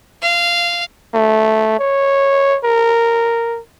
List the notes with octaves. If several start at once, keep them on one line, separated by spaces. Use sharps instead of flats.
F5
A3
C#5
A#4